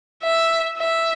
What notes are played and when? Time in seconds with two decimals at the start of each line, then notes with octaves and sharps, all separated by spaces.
0.23 E5
0.78 E5